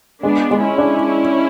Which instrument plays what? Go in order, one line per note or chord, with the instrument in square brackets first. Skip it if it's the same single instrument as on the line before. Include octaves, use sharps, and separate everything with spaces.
[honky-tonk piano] G#3 [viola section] B3 D4
[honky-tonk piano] G#3
[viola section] C#4 E4
[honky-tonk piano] D4